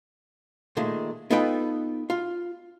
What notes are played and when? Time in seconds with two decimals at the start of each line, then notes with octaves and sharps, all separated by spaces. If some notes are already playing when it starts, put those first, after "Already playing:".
0.77 A#2 D#3 G#3 A3
1.30 B3 D#4 F4 A4 B4 G5
2.10 F4